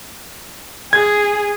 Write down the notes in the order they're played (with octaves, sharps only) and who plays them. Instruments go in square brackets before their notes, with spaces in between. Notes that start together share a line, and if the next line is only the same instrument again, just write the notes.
[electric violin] G#4 [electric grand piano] G#6